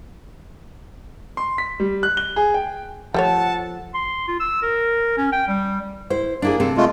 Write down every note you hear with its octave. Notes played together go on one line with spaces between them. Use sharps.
C6
B6
G3
F#6
G7
G#4
G5
F3 G3 A3 A4 C#5 F#5 A5
C6
F4
E6
A#4
C#4
G5
G3
E4 C5
A#3 D4 E4 G#4
C3 C4 A4
G#3 A3 F4